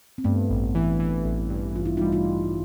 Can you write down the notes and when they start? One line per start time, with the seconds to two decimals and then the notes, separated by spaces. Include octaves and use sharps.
0.18 C4
0.24 G2 A3 B3
0.49 A1
0.75 E3
1.00 E3
1.25 A1
1.50 G2
1.75 A1 F4
1.86 E4
1.97 G3 D#4 F4
2.12 D#4 F4
2.25 E3